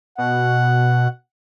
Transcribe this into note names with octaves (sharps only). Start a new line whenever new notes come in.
B2 F#5